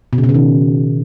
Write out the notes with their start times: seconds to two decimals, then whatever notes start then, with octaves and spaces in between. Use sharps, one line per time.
0.13 B2
0.18 C#3
0.24 B2
0.29 C#3
0.34 D#3